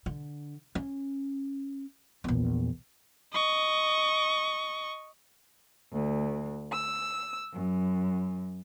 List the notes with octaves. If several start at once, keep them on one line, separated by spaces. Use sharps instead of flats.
D3
C#4
A#1 E2
D#5 C#6
D2
E6
F#2